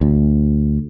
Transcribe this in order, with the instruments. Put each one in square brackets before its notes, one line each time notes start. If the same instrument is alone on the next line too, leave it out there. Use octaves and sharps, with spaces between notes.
[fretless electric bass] D2